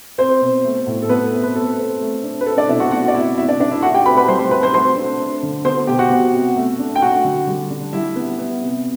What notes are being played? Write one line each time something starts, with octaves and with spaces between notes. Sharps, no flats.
C4 C5
B2
A3
A2
A4
A3 B3 B4
C4
B4
A3 A4
C4
A3
D4
B4
C4 A4
D4 D5
B2 E4 E5
F#4 F#5
D4 F#4 F#5
D5
C3 E4 E5
A3 E4 E5
D4 D5
D4 D5
E4 E5
A3 F#4 F#5
G4 G5
C4 B4 B5
B4 B5
G3 C5 C6
C5 C6
C4 B4 B5
C5 C6
A3 C5 C6
D4
D4
D3
B3 C5 C6
B2 G4 G5
F#4 F#5
B3
C3
A3
D4
G5
D4 F#4 F#5
D3
G3
D4
G3 E4 E5
B3
B3
C3